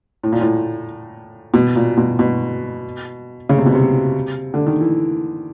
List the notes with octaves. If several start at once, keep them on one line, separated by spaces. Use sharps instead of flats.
A2
A#2
A2
B2
A#2
B2
B2
C#3
C3
B2
C3
D3
D#3
E3